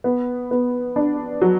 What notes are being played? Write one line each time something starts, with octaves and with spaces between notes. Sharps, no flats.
B3
B3
D4
F#3